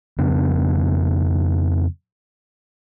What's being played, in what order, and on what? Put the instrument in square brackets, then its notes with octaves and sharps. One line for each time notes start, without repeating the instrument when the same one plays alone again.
[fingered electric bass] F2 C#3 B3 D4